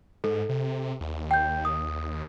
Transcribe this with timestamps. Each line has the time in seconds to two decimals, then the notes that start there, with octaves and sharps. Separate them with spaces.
0.24 G#2 A4
0.49 C3
1.01 D#2
1.31 G5 G6
1.65 D#6